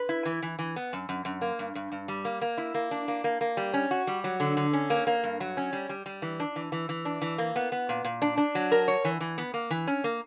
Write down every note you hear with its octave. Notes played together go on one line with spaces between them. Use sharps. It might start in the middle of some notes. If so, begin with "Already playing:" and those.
Already playing: B4
E4
E3
E3
E3
B3
F#2
F#2
F#2
A#3
G2
G2
G2
G3
A#3
A#3
E4
A#3
D4
A#3
A#3
A#3
G3
C#4
F#4
G3
F#3
D3
D3
C#4
A#3
A#3
G2
F#3
C#4
G3
G3
G3
E3
D4
E3
E3
E3
D4
E3
A#3
B3
B3
A#2
A#2
D4
D4
F#3
A#4
C#5
E3
E3
B3
A#3
E3
C#4
A#3